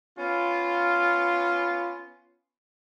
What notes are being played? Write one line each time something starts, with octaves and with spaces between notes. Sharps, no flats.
B3 C#4 F4